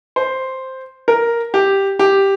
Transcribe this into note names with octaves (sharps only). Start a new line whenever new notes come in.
C5
A#4
G4
G4